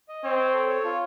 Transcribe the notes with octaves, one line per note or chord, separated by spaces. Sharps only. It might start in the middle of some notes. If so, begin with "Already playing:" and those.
D#5
C4 C#5
C#5
A4
C#5
F4